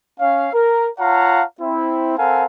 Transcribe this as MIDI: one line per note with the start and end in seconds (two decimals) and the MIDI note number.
0.20 0.49 61
0.20 0.49 77
0.53 0.89 70
0.99 1.42 65
0.99 1.42 73
0.99 1.42 77
0.99 1.42 78
0.99 1.42 81
0.99 1.42 82
1.61 2.16 60
1.61 2.16 64
2.17 2.44 60
2.17 2.44 69
2.17 2.44 70
2.17 2.44 77
2.17 2.44 78
2.17 2.44 80